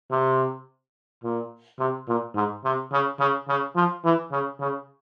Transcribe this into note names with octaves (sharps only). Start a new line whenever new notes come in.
C3
A#2
C3
A#2
G#2
C3
C#3
C#3
C#3
F3
E3
C#3
C#3